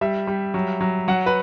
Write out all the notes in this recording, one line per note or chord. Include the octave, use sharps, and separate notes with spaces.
G3 E5
G3
F#3
F#3
F#3 F#5
B4